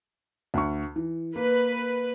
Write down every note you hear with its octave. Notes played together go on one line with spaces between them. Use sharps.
D2 C#6
E3
A#3 B4